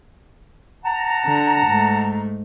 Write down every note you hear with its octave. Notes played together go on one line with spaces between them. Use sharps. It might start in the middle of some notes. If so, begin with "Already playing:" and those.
F#5 A5 A#5
D3
G#2 A3